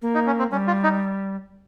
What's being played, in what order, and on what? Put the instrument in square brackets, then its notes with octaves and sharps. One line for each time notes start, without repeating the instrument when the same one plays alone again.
[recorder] A#3
[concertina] D#4
C#4
C4
[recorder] G3 [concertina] C#4
[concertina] F4
D#4